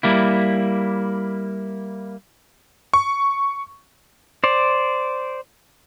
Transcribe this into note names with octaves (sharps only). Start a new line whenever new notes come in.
G3 A#3 E4
C#6
C5 D5